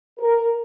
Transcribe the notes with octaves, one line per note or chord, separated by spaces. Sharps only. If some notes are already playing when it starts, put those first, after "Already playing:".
A#4